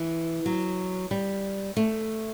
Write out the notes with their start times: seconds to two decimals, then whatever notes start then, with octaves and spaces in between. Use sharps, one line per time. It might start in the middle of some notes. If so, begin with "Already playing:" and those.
Already playing: E3
0.46 F#3
1.11 G3
1.77 A3